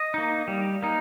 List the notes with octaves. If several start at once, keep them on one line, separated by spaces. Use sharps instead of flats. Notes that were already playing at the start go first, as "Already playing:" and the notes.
Already playing: D#5
A#3 D#4
G3
A#3 D#4